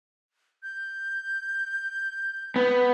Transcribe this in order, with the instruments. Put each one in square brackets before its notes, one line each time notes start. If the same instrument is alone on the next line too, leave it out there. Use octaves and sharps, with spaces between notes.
[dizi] G6
[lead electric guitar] B3